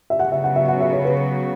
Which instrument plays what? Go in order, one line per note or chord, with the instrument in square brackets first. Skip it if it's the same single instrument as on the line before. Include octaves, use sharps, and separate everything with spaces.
[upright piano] E5
[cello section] C#3 F#3 B3 F#4 [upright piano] F#5
[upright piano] E5
F#5
E5
F#5
E5
C#5
B4